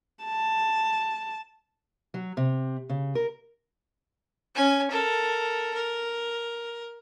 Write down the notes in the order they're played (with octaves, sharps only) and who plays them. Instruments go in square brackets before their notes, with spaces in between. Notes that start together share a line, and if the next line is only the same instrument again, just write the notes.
[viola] A5
[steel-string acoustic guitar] F#3
C3
C#3
A#4
[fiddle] C#4 G#5
A4 A#4
A#4